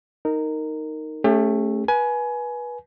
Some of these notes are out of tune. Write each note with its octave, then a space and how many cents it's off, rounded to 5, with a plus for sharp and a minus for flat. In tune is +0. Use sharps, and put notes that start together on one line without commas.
D#4 +0 A#4 -15
A3 +0 C#4 +0 G4 +40
B4 -25 G#5 +20